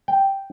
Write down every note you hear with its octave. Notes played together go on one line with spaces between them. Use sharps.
G5